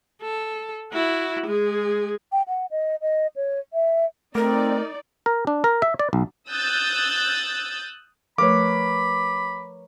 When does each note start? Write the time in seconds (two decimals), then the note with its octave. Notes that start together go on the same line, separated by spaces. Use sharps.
0.21 A4
0.93 E4 F#4
1.46 G#3 G#4
2.32 G5
2.48 F#5
2.71 D#5
3.02 D#5
3.36 C#5
3.73 E5
4.35 A3 C4 D#4 A#4 D5
5.26 A#4
5.47 D4
5.64 A#4
5.82 E5
5.99 D5
6.13 B1
6.50 D#6 E6 F#6 G6 A6
8.38 F3 A3 A#4 B4 C#5 B5 D6